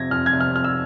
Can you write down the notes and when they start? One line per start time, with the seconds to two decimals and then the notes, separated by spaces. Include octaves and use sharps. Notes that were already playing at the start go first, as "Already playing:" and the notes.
Already playing: F2 C3 G#6 A#6
0.11 F2 F6
0.26 G#6
0.33 C3
0.41 F6
0.55 F2 F6
0.64 E6